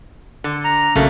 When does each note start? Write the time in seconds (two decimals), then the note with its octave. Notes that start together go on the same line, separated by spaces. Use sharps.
0.44 D3
0.65 A#5
0.96 A#1 C#3 F#3 A3 A#3